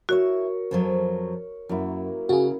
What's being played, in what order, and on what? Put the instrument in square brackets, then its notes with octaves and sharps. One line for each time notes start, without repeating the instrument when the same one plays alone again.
[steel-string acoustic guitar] E4 E5 [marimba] F#4 [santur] A#4 C#5
[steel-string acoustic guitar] F2 F3 F#3
[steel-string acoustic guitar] F#2 [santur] F#3 A#3 E4
[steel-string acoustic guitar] C#3 [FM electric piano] F#4 G#4